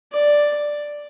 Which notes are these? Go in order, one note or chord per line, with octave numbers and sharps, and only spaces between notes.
D5